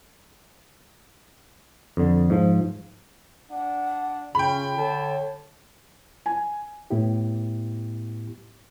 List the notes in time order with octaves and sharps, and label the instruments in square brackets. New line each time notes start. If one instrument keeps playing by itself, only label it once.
[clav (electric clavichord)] F2 D3
G#2 F3
[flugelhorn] D4 [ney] F#5
[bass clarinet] C#3 [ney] C#4 [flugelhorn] F4 [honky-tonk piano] G5 B5
[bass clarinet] D3 [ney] C#5 [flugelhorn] A5
[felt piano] G#5
[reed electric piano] A2 B3 E4 G4